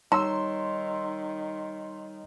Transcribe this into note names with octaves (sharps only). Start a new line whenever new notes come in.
D#3 G3 D#4 C#5 A#5 C6 E6